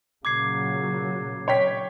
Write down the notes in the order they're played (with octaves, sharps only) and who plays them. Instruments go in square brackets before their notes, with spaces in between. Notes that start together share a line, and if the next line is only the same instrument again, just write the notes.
[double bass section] A#2 C#3 F#3 [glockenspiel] D6 G#6 C7
[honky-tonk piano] C#5 G5 B6